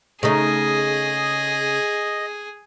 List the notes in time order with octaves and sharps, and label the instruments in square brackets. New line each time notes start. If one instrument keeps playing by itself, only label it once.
[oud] C#3 A3 D#4 [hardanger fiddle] G#4 [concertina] D#5